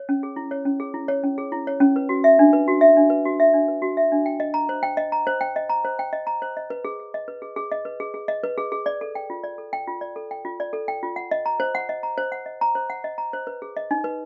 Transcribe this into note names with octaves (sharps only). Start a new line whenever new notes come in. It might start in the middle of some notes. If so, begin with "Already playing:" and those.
Already playing: C#5
C#4
G#4
E4
C#5
C#4
G#4
E4
C#5
C#4
G#4
E4
C#5
C#4
B4
F#4
E5
D4
B4
F#4
E5
D4
B4
F#4
E5
D4
B4
F#4
E5
D4
G5
D#5
A#5
C5
G5
D#5
A#5
C5
G5
D#5
A#5
C5
G5
D#5
A#5
C5
D#5
B4
G#4
G#4
D#5
B4
G#4
G#4
D#5
B4
G#4
G#4
D#5
B4
G#4
G#4
D5
A4
G5
F4
D5
A4
G5
F4
D5
A4
G5
F4
D5
A4
G5
F4
F#5
D#5
A#5
C5
F#5
D#5
A#5
C5
F#5
D#5
A#5
C5
F#5
D#5
A#5
C5
B4
G#4
D#5
D#4
B4